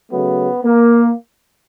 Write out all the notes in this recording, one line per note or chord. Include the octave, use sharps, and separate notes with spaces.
C#3 F#3 A3 B3
A#3